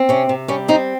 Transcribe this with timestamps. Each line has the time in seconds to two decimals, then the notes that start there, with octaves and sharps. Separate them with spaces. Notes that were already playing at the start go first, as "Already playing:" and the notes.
Already playing: C4
0.09 C3 C#4
0.29 C3
0.48 G3 C#4
0.68 C4 D#4